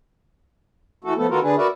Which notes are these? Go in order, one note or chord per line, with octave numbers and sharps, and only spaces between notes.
E3 A3 F#4 A4
F3 A3 B3 A4
D#3 B3 F4 F#4 A4 A#4
D3 D4 G#4 B4
F#4 A#4 B4 D5 E5